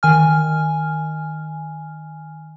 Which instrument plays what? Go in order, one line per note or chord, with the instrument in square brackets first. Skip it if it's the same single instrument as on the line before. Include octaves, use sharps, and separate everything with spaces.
[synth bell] D#3 G#5 F6